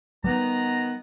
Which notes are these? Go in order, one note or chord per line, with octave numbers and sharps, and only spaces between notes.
D#3 G3 B3 A#5